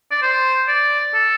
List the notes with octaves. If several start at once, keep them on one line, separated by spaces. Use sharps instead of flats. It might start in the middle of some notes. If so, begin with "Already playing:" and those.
D5
C5
D5
A4